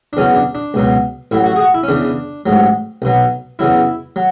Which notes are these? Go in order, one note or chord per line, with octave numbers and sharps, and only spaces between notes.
D4
E2 C#3 F#3 C#4
D4
D4
C#2 B2 F#3
A1 A2 F#3 E4
F#4
G#4
F#4
E4
C#4
E2 C#3 E3 D4
A1 G#2 F#3
B1 B2 F#3
E2 C#3 F#3 E4
F#3